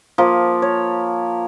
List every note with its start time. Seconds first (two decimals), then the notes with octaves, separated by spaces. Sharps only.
0.18 F3 A#3
0.62 C#5